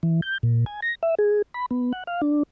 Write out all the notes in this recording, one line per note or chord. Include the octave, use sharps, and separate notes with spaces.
E3
G6
A#2
G#5
A#6
E5
G#4
B5
B3
F#5
F5
D4